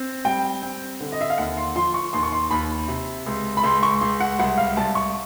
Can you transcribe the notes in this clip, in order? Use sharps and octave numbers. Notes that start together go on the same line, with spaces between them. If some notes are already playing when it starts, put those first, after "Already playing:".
Already playing: C4
G3 G5
C4
D3
D#5
E5
F5
D#2 F#5
C6
F3 C6
C#6
D#2 C6
C#6
C6
D#2 B5
C3
C#2
B5
C#2 C6
C#6
C#2 C6
F#5
C2 F#5
F5
C2 A5
C#6